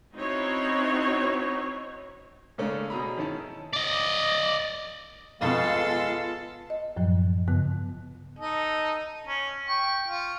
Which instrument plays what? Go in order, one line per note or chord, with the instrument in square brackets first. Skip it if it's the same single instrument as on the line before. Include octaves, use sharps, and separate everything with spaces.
[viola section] C4 C#4 D#4 E4 F#4 C#5
[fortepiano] G#2 C#3 A3 A#3 C#4 D4
B2 G#4 A#5 B5
D#3 C#4 E4 A5
[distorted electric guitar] D5 D#5
[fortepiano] F2 B2 [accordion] G#3 F5 [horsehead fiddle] B3 F4 [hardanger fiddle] A4
[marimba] D#5
F#2 A2 F3 F#3
G2 C#3 B3 F#6
[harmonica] D#4 A4 D#5
C#4
G5 C#6
F4